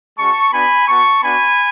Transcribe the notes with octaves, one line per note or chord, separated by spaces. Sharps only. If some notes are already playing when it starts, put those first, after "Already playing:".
G#3 C#4 F#4 A5 C#6
B3 D4 F#4 G#5 B5
B3 F#4 A5 C#6
B3 D4 F#4 G#5 B5